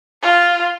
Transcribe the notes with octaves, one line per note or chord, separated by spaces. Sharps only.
F4